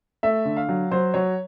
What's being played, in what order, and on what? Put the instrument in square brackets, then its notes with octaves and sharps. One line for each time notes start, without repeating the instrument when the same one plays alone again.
[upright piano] A3 E5
D3
F5
F#3
F#3 C5
F#3 C#5